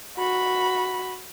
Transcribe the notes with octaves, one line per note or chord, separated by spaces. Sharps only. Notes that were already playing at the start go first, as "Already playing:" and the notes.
F#4 B5